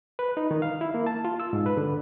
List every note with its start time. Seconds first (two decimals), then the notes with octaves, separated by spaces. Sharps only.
0.19 B4
0.37 D#4
0.51 D#3
0.62 F5
0.81 E4
0.94 A#3
1.07 A5
1.25 F4
1.40 E6
1.53 G#2
1.66 B4
1.77 D3